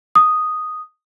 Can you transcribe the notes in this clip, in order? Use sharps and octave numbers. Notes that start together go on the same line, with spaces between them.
D#6